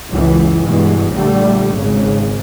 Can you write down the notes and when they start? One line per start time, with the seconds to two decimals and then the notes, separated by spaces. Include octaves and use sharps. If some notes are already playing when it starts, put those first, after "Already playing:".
0.10 C#2 F#2 E3
0.65 G2 B2 E3 G#3
1.13 A#1 D3 G3 A3
1.74 G#1 G#2 C#3